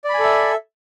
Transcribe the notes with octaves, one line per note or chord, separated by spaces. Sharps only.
A4 D5 E5 G#5 B5